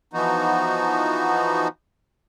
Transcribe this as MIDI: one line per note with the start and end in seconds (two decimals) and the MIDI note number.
0.13 1.68 52
0.13 1.68 53
0.13 1.68 59
0.13 1.68 63
0.13 1.68 66